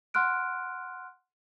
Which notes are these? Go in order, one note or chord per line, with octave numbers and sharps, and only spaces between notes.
F#5 C6 F6 F#6 D7